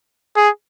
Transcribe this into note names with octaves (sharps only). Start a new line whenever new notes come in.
G#4